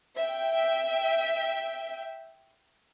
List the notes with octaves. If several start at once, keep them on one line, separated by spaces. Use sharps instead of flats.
E5 G5